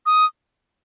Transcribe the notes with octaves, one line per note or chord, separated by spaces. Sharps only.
D#6